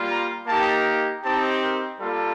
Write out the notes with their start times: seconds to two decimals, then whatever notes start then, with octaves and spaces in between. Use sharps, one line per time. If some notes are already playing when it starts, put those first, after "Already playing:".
Already playing: G3 A#3 F4
0.08 A#5
0.47 A#3 D#4 G4 A5
1.23 C4 D#4 G4 A5
1.62 A#4
2.00 G3 A#3 F4 A4